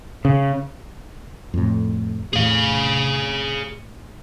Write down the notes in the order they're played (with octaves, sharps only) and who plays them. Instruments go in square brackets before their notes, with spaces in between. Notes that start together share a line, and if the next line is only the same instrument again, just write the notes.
[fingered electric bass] C#3
[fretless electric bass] F2 A2
[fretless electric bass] E2 A2 [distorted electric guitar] G#4 F5